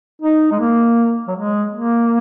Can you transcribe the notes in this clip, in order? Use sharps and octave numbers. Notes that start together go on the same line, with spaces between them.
D#4
G#3
A#3
F#3
G#3
A#3